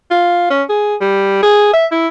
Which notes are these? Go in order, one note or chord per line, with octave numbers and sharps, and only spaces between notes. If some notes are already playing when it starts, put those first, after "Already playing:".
F4
C#4
G#4
G3
G#4
E5
E4